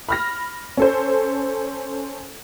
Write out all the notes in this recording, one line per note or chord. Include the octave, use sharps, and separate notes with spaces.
B5 F6 A#6
C#4 A4 C5